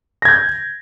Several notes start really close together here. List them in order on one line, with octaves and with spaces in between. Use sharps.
A#6 G#6 G6